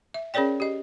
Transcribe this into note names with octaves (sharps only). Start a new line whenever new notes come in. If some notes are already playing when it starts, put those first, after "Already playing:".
E5
C#4 G#4 A#4 C#5 D5 G5
G4 D#5